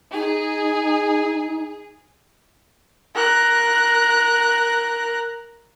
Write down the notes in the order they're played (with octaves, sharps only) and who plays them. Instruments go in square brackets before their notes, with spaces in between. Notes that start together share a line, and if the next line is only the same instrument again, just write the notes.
[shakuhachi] D#4 [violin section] G#4
[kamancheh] A#4 F#6